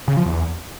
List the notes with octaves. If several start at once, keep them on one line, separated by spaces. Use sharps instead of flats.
C#3
F3
E2